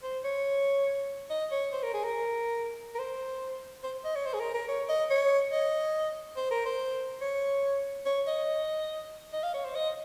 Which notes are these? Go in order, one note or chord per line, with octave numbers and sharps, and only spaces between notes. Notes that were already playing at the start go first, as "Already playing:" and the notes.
C5
C#5
D#5
C#5
C5
A#4
G#4
A#4
A#4
C5
C5
D#5
C#5
C5
G#4
A#4
A#4
C#5
D#5
C#5
D#5
C5
A#4
C5
C#5
C#5
D#5
D#5
F5
C#5
C5
D#5